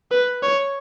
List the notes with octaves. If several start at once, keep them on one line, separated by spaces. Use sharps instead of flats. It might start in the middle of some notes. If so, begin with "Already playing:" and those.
B4
C#5